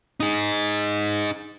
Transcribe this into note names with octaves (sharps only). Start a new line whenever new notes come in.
D#4 G#4